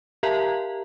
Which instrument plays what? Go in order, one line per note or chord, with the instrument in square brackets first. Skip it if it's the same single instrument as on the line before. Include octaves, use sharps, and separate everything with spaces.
[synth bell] G4 A#4 E5 F5 A5 A#5